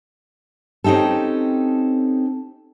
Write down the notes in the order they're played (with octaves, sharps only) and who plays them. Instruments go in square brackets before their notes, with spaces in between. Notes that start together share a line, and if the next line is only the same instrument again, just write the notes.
[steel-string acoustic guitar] C4 C#4 D#4 G4 A4